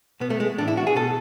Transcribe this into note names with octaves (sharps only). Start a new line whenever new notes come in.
B2 B3
A3
G#3
A2 E3 D4
E4
F#4
G#4
B2 A4